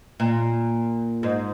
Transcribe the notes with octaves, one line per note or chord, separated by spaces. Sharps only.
A#2
G#2